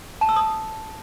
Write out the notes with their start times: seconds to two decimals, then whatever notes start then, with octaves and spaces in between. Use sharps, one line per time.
0.21 A5
0.29 E6
0.36 D#6